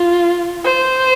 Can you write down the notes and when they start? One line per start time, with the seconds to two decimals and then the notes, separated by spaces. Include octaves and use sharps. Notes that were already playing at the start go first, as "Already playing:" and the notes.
Already playing: F4
0.65 C5